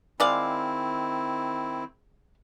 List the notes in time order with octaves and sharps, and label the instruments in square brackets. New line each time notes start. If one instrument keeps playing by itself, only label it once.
[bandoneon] D#3 C4 E4 [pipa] G#3 D5 F5